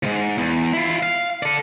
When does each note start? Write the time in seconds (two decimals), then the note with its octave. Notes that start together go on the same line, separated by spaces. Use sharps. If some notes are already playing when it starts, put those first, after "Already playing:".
0.03 D#2 G#2
0.38 E2
0.73 E4 F4
1.03 F5
1.43 A4 D5